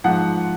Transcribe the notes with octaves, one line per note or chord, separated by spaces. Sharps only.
G#2 F3 F#5